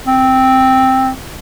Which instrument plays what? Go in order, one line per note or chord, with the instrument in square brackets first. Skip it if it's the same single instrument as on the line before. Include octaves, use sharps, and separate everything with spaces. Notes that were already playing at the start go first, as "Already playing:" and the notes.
[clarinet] C4